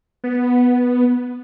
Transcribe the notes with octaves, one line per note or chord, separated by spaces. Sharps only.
B3